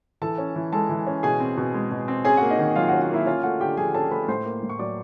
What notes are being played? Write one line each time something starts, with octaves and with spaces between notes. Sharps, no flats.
E3 A4 A5
C#4
E3
G#3 A4 A5
E3
C#4
B2 G#4 G#5
C4
B2
G#3
B2
C4
C#4 G#4 G#5
F#4 F#5
A#3
D#4 D#5
D#3
F#3 F4 F5
F#4 F#5
C#4
F#4 F#5
A#3 E4 E5
C#4 F4 F5
A3 F#4 F#5
D3 G4 G5
F3 G#4 G#5
C#4 A4 A5
A3 B4 B5
A2 C5 C6
A#3
A2
C#6
F#3 D5 D6